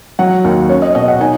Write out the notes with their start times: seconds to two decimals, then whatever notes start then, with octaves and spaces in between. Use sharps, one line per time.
0.19 F#3 F#5
0.44 D#2
0.69 C#4 C#5
0.82 D#5
0.95 B2 D#5
1.08 F#5
1.20 D#4 G#5